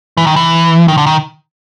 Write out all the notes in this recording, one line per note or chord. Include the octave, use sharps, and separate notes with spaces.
E3
D#3
E3
D#3
D3
D#3